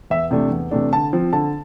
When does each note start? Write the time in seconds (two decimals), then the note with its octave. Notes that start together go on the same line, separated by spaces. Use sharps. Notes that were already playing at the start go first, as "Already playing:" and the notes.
0.10 E2 E5
0.31 C3 E3 A3 D4
0.51 E2
0.71 C3 E3 A3 D4
0.92 D3 A5
1.13 F3 C4
1.33 D3 A5